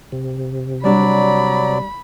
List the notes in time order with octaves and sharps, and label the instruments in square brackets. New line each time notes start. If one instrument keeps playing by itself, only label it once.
[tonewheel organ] C3
[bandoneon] F#3 D5 [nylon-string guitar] G3 D4 [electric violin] B5